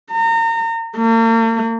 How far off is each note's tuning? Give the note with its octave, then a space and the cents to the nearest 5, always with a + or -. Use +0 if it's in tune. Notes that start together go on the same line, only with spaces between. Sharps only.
A#5 -30
A#3 -45